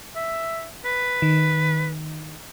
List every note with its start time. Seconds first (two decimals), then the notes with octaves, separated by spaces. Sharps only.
0.16 E5
0.85 B4
1.22 D#3